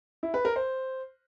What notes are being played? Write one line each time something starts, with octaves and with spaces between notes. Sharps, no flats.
E4
B4
A#4
C5